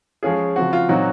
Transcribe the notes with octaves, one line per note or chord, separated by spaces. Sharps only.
F3 G#3 C#4 F4 G#4
C#3 F3 C4 F#4
F4
A#2 F#3 C4 D#4 F#4